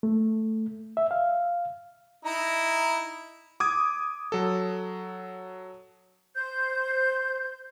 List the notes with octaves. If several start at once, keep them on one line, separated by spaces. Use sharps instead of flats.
A3
E5
F5
D#4 E4 A#5
D6 D#6 G#6
F#3 A4
C5 G6